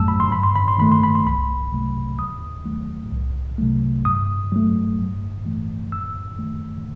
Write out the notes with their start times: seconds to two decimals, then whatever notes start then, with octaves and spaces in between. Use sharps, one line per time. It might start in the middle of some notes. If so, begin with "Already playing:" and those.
Already playing: G1 F#2 F#3 A3 A5 E6
0.08 B5
0.20 C6
0.31 G2 B5
0.43 C6
0.56 B5
0.68 C6
0.79 D#3 A3 B5
0.92 C6
1.03 B5
1.15 C6
1.25 C2 B5
1.72 C3 F#3 A3
2.19 D#2 D#6
2.65 D#3 F#3 A3
3.12 C2
3.58 C3 F#3 A3
4.05 G2 D#6
4.52 F#3 A3
4.99 G2
5.45 E3 A3
5.92 F#2 E6
6.39 D#3 A3